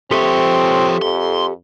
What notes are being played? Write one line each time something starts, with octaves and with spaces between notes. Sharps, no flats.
F3 C4 G4 A4 C#5 E5
F2 C6